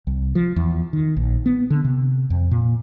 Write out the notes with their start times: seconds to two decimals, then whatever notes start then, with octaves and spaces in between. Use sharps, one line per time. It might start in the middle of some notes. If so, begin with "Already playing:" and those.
0.07 C2
0.35 F3
0.56 E2
0.93 D#3
1.17 A#1
1.46 B3
1.70 D3
1.84 C3
2.30 F2
2.51 A#2